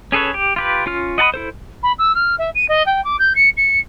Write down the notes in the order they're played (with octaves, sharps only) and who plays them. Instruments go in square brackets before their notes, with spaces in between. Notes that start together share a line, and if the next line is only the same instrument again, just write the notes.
[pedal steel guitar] C#4 G#4 A4 B4 C#5
G4
F4 G4 B4
C#4 F4 F6
D#5 F#5 A5 B5 D#6
E4 A4 C5
[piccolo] B5
E6
F6
E5
D#7
D#5
G5
D6
G6
C#7
C#7